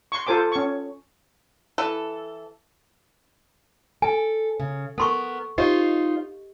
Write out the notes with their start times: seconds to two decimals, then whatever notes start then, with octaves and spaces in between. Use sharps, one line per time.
0.12 C6 C#6
0.27 F4 A4 C5 G#5 D6
0.52 C#4 C#6
1.78 E3 A4
4.02 A4 G#5
4.60 C#3
4.98 B3 A4 A#4 C6 C#6
5.58 D#4 F4 G4 C5 D#5